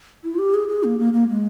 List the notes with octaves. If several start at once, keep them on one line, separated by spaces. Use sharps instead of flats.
E4
F4
G4
G#4
G#4
A#3
A#3
A#3
G#3